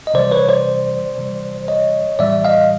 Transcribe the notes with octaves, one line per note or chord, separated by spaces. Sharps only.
D#5
C3 E3 G3 C5 D5
B4 C#5
C5 D5
C3 E3 G3
C#5 D#5
A2 E3 G3 D5 E5
D#5 F5